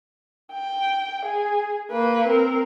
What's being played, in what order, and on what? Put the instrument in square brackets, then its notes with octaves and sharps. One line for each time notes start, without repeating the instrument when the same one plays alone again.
[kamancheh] G5
G#4
A#3 B4
C4 A#4